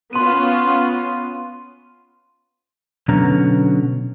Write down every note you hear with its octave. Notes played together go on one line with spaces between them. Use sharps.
B3 C#4 F4 C6 D#7
B2 D3 F#3 B3 C#4 A#5